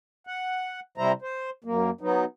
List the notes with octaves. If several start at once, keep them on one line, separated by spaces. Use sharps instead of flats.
F#5
C3 G3 E4 C5 A#5
C5
F#2 A#3
F#3 B3 D#4